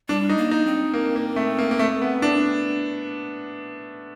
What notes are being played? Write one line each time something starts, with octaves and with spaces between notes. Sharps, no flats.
G3 D4
D#4
A#3
D#4
C4
A#3
A#3
A3
A#3
A#3
A3
B3
D4